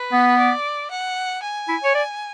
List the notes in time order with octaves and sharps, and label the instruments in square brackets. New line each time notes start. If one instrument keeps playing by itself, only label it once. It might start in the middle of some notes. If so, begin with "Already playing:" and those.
Already playing: [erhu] B4
[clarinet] B3
[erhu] D5
F#5
G#5
[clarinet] E4
C#5
D5